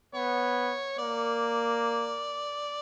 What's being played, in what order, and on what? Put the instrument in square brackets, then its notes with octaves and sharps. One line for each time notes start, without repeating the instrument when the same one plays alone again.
[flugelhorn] B3 [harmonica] C#5
[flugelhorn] A#3 [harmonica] D5